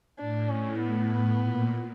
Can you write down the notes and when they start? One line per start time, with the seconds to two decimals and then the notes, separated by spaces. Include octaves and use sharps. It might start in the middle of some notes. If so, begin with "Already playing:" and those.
0.19 A2 D4
0.49 C#4
0.81 B3
1.41 A#2